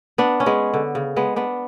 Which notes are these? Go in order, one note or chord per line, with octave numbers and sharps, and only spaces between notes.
B3 D4
C#4
G#3 B3
D3
C#3
G#3 B3
B3 D4